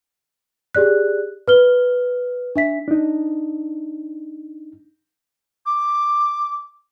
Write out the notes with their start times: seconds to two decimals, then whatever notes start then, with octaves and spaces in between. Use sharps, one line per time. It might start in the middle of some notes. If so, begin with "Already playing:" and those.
0.75 G4 G#4 D5 F#6
1.48 B4 F6 G7
2.55 D4 E5 B6
2.88 D4 D#4
5.66 D6